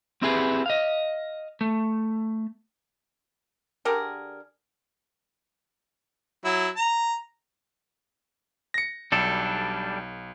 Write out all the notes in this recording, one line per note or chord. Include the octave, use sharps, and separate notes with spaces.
C4 E4 G4 G#4 B4
D#5 F5
A3
D3 G4 G#4 A#4
F#3 E4
A#5
A#6 C#7
B1 G3 D4 A4